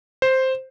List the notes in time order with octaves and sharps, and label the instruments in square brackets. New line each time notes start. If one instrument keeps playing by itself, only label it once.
[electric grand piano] C5